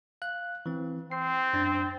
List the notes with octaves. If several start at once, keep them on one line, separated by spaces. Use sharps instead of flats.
F5 F#6
E3 C4
C4 C7
F#2 D4 A6